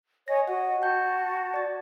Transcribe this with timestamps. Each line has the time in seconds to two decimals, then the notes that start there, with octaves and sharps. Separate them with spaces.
0.28 C#5 D#5 G#5 A#6
0.47 F#4 D#5 F#5
0.82 F#4 G5 A5 G6
1.54 D5 A6